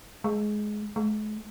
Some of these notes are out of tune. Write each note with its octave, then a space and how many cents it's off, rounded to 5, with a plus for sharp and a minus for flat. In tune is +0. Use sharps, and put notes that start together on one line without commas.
G#3 +15
G#3 +45